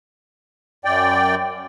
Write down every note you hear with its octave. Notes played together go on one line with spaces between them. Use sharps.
F#2 D5 G5